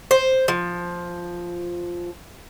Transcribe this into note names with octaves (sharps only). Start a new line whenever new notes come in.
C5
F3